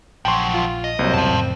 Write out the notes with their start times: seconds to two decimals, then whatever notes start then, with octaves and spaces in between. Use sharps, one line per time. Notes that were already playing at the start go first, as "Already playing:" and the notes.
0.25 A#1 F3 F#3 G5 C6
0.54 F4
0.84 D#5
0.99 C2 F#3 A#3 C4
1.14 F#2 B2 E3 F5 A5
1.28 F2 A2 C#3